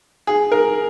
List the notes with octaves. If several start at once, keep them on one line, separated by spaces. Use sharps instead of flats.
G#4
A#4